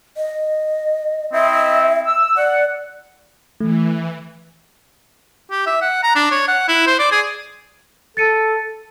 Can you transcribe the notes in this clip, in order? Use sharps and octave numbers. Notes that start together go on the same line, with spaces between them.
D#5
C4 E4 D#5 E5
E6
D5 F#5
E3 A3
G4
E5
F#5
A#5
D4
C#5
F#5
E4
C5
D5
G#4
A4 A6 C#7 D#7